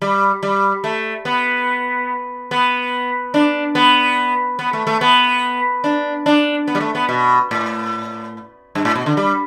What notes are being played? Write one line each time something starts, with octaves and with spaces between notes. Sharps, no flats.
G3
G3
A3
B3
B3
D4
B3
B3
A3
A3
B3
D4
D4
B3
G3
A3
B3
B2
A2
G2
A2
B2
D3
G3